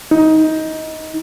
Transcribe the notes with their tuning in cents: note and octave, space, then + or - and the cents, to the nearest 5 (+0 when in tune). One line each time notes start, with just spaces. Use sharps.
D#4 +20